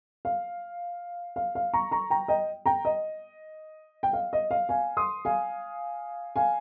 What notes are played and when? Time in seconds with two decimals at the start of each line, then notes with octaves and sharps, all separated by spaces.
0.25 F5
1.36 F5
1.55 F5
1.74 A#5 C#6
1.91 A#5 C#6
2.10 G5 A#5
2.28 D#5 G5
2.66 G5 A#5
2.85 D#5
4.03 G5
4.13 F5
4.33 D#5
4.51 F5
4.69 F5 G#5
4.97 C6 D#6
5.25 F5 G#5
6.36 F5 G#5